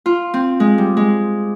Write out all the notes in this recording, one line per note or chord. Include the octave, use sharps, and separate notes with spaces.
F4
C4
G#3
G3
G#3